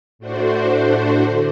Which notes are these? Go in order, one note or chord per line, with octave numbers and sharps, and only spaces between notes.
A2 A3 D4 F#4 C5
D3